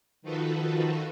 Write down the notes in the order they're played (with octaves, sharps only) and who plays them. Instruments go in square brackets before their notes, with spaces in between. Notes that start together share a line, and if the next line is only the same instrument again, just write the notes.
[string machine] D#3 F3 F4 F#4 A4 B4